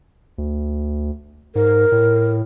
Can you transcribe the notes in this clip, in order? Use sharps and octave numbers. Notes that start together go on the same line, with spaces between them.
D2
G#2 A#4
A2